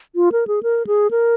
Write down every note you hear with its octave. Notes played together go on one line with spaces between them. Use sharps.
F4
A#4
G#4
A#4
G#4
A#4